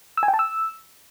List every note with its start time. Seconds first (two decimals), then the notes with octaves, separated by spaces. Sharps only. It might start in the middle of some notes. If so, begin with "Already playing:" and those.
0.17 E6
0.23 G#5
0.28 G5
0.34 A5
0.39 E6